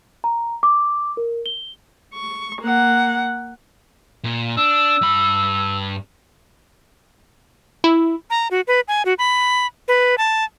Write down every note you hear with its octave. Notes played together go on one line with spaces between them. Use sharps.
A#5
D6
A#4
G7
C#6
A#3 F#5
A#2
D4 E6
G2 B5
E4
A#5
F#4
B4
G#5
F#4
B5
B4
A5